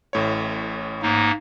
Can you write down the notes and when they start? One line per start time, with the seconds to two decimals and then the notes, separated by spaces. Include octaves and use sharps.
0.13 A1 A2 C#5
1.02 G#2 A#3 D#4